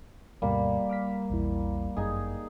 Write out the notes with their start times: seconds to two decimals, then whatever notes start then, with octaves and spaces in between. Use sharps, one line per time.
0.42 D2 G2 B2 G3 A#3
0.90 D6 F6 B6
1.30 A#1 E2 E4
1.97 G1 F#2 D#4 G#4 G#6